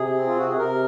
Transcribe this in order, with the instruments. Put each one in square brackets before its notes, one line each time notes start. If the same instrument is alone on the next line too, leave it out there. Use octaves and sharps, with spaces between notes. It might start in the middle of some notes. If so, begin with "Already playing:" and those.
Already playing: [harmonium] C3 G#4
C4
F4
C3 F#4
G#4
C3 A#4